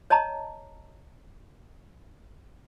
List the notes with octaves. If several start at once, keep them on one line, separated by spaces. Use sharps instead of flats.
C#5 D#5 A5 A#5